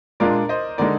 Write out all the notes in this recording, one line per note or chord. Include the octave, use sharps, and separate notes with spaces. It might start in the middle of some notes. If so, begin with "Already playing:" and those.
A#2 G#3 D4 F4 A#4 D5
C5 D#5
D3 G#3 D#4 A#4 D5